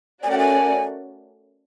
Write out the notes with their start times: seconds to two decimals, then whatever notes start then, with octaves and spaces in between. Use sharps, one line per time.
0.23 A3 C#4 F#4 A#4 D5 G#5
0.31 G5
0.38 G#5